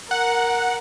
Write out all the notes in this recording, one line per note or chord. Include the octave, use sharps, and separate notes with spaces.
A#4 F#5